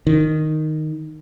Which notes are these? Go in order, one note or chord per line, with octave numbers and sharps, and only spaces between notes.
D#3